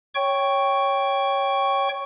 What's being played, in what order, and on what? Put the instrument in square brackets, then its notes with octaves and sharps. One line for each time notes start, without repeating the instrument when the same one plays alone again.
[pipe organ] C#5 G5 C#6